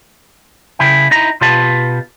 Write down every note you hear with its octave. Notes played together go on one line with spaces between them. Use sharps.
C#3 E4 G5
D#4 E4 A#5
B2 F4 G4 B4 A5